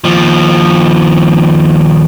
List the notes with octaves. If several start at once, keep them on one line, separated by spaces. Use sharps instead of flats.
D#2 F3